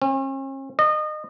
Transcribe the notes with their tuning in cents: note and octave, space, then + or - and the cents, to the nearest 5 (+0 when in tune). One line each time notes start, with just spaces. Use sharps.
C#4 -45
D#5 -30